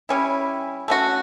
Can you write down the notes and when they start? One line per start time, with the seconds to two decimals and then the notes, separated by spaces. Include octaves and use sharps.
0.09 G3 C#4 E4
0.88 A3 C#4 F#4